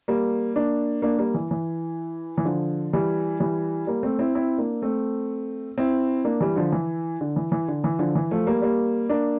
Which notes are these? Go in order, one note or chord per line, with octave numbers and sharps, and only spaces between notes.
G3 A#3
A#3 D4
A#3 D4
G3 A#3
E3
E3
E3
D3 F3
E3 G3
E3 G3
G3 A#3
A3 C4
C4 E4
C4 E4
A#3 D4
A3 C4
C4 E4
A#3 D4
E3 G3
D3 F3
E3
D3
E3
E3
D3
E3
D3 F3
E3
F3 A3
G3 A#3
G3 A#3
A#3 D4